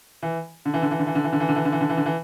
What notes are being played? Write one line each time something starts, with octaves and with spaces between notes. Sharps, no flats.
E3
D3
E3
D3
E3
D3
E3
D3
E3
D3
E3
D3
E3
D3
E3
D3
E3
D3
E3